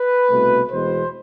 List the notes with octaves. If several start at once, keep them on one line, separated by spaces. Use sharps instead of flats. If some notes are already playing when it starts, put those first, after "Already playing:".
Already playing: B4
C2 B2 A3
E2 B2 G#3 C5